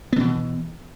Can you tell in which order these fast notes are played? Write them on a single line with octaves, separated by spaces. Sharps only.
B3 D3 B2 E3